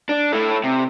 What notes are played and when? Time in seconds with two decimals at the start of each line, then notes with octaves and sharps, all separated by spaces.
0.09 D4
0.33 A3 E4
0.64 C3